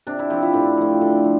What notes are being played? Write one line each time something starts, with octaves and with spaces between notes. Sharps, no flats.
C3 D4
E4
F3 C4 G4
E4
A2 D4
F3 A3
D3
F3